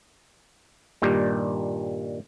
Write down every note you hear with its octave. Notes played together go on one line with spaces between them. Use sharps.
G2 A#2 D#3 G3